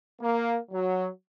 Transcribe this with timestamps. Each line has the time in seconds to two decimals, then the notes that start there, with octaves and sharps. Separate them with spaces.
0.21 A#3
0.71 F#3